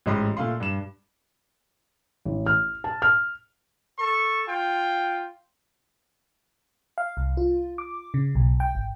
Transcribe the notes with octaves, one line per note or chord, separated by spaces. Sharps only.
A1 G#2 D#5 B5 C6
A#2 A3 F5 C6
G2 E7
A1
F6
A5
F6
A4 C#6
F4 G5
F5
C2
F4
D6
C#3
B1
G5
G#1